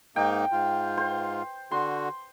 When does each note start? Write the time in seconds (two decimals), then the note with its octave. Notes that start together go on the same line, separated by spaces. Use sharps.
0.16 G#2 A#3 D#4 G5
0.52 G#2 F4
0.97 C5
1.71 D3 F#4 C6